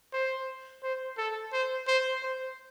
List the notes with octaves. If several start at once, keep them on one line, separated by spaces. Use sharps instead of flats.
C5
C5
A4
C5
C5
C5